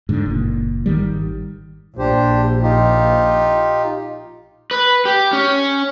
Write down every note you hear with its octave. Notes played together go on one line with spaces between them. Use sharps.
G#2 D3
F#1 A#2
G#1 D#3 G3
A#1 D4 G4 C5
D#4 F4 G4
B4
G4
C#4